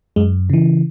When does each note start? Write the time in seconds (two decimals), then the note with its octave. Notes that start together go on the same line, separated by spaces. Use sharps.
0.16 F#2 G#3
0.50 C#3 E3